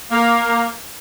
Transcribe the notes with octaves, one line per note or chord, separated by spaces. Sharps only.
A#3